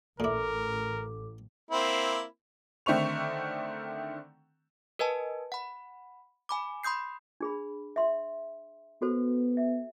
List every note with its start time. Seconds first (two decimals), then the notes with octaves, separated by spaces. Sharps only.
0.20 A1 A#2 E4 A4 A#4 D6
1.71 A#3 C4 E4
2.86 D3 D#3 A3 C4 C#6 F7
4.99 A#4 B4 D#5 G#5 A5
5.52 F#5 B5
6.49 G#5 B5 D6
6.83 B5 C6 D#6 G6 C7
7.41 D4 G#4 B5
7.96 E5 C6
9.02 B3 F#4 A4 C5
9.57 E5